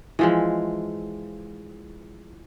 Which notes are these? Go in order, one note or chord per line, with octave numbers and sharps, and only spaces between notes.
E3 F3 G#3